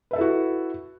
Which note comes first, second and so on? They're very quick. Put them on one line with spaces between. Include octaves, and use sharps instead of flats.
B4 E5 A4 E4 F#4